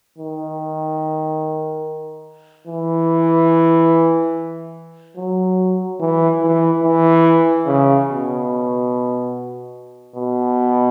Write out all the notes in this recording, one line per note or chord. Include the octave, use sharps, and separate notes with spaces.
D#3
E3
F#3
E3
E3
E3
C#3
B2
B2